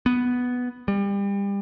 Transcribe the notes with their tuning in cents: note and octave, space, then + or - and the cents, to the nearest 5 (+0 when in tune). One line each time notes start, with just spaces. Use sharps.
B3 +0
G3 +30